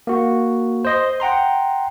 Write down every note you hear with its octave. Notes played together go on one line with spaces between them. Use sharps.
A#3 F#4
C5 D#5 C6
F#5 G5 A#5 C6